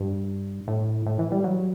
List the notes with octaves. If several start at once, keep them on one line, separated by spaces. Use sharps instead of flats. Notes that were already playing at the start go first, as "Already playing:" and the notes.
Already playing: G2
A2
A2
E3
G3
F#3